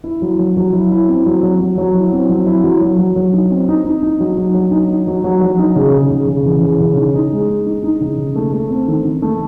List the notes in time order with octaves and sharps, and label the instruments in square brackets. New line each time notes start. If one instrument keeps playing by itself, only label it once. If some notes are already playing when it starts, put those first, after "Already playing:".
[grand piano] E4
F#3
F#3
F#3
E4
E4
C4
F#3
F#3
F#3
F#3
E4
C4
F#3
E4
F#3
F#3
F#3
F#3
D#4
C4
D#4
D#4
D#4
F#3
F#3
F#3
D#4
D#4
F#3
F#3
F#3
D#4
C#3
C#3
C#3
C#3
E3
C#3
C#3
D#4
D#4
G#3
G#3
D#4
D#4
C#3
C#3
A3
A3
C4
D#3
D#3
A3